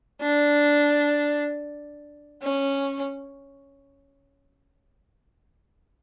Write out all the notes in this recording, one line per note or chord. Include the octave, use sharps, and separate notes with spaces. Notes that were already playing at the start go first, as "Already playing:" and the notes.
D4
C#4